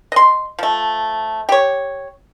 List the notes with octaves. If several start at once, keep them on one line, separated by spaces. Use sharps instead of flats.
D#5 C6
F3 A3
G4 C#5